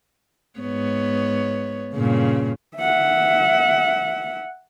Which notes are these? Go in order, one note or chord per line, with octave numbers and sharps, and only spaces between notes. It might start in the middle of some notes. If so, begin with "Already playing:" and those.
G#2 B3 C#5
G2 A#2 C#3
E5 F#5